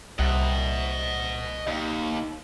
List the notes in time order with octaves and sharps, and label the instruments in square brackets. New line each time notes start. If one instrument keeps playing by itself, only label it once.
[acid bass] C2 [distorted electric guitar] D#5 F#5
[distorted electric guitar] D#2